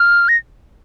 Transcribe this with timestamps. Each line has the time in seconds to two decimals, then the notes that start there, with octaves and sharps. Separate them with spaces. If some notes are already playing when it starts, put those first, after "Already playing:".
Already playing: F6
0.29 A#6